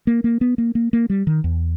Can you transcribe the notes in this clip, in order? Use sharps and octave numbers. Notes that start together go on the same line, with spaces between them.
A#3
A#3
B3
A#3
A#3
A#3
G3
D#3
E2